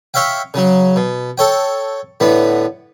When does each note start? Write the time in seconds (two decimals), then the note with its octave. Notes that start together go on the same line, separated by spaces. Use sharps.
0.14 C#5 E5 F5 G5
0.54 C#3 F#3
0.96 B2
1.38 A4 C#5 G5
2.20 A2 D3 B3